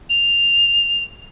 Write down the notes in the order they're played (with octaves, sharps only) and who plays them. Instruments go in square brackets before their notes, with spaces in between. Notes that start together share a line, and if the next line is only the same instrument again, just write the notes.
[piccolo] F7